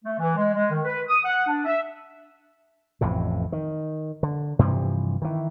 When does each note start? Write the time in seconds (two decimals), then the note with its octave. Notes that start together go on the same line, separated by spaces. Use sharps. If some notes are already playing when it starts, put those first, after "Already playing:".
0.05 A3
0.19 E3
0.36 G#3
0.54 G#3
0.70 D#3
0.85 B4
1.08 D#6
1.25 F#5
1.48 D4
1.65 E5
3.01 A1 F2 A2 C3
3.52 D#3
4.23 D3
4.59 G2 C3 E3 F3
5.22 D#3 E3